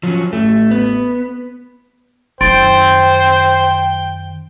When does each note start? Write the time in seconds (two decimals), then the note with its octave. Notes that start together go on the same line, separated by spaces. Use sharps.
0.03 F3 F#3 C#4
0.33 A1 A3
0.71 B3
2.41 F#2 D#3 C5 G5 C6 A6 D7